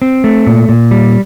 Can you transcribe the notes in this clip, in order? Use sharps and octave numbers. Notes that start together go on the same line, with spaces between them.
C4
A3
A#2
A#2
G3